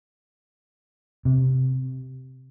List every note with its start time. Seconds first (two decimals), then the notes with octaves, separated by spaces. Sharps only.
1.25 C3